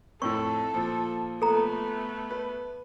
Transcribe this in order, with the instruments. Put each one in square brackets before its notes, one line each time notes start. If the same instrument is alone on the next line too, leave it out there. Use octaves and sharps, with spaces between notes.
[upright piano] F2 A2 E4 [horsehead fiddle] A4 [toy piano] C#6
[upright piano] A#2 F3
[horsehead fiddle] A3 B3 [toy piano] A4 A#5
[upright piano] B4